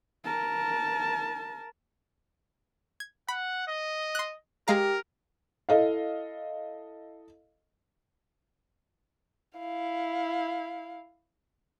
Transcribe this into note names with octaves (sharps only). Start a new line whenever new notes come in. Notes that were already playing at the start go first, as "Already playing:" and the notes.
A#4 A5
G#6
F#5 B5
D#5
C6 F#6
G#3 G4 A#4 F5 A#5
E4 A4 D#5 F5
E4 F5